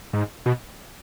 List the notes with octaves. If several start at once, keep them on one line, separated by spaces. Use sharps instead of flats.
G#2
B2